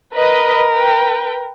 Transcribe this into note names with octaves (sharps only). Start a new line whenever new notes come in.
A#4 B4 D#5 B5
B4 G5